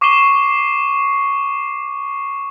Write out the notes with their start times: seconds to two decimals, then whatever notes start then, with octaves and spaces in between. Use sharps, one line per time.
0.01 C#6 D6 C7 D#7 E7 G7